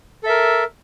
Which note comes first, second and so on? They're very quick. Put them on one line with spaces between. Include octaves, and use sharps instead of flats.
A4 E5 A#4